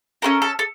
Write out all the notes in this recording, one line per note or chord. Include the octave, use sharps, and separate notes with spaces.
C#4 F#4 A4 A#4
A4
A4